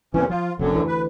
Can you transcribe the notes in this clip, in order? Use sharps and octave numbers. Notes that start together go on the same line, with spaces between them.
E2 C3 E3 F3 A#3 C#4
F3 F4
F1 F#2 D3 F#3 C4
D2 E3
B4